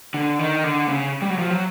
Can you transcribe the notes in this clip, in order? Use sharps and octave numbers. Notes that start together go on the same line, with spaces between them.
D3
D#3
D3
C#3
G3
F#3
F3
F#3